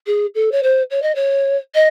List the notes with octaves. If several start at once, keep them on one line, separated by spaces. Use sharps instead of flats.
G#4
A4
C#5
C5
C#5
D#5
C#5
D#5